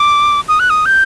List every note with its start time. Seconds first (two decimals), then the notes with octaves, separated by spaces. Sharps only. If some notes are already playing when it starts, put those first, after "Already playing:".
Already playing: D6
0.48 D#6
0.59 F#6
0.70 D#6
0.85 G6